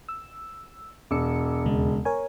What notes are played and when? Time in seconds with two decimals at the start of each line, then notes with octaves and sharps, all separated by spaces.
0.09 E6
1.11 E1 D6 E6 C#7
1.65 D#2 C#3 G#3
2.05 A#4 C#5 G#5